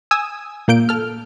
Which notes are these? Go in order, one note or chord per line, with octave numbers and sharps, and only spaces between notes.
G#5 D#6 E6
A#2 A#3 G6 D7
A4 F6